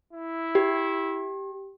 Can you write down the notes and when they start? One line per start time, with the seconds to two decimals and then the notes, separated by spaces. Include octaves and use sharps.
0.13 E4
0.55 G4